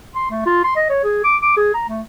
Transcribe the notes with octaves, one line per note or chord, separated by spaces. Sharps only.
C6
A3
F4
C6
D#5
C#5
G#4
D6
D6
G#4
A#5
A3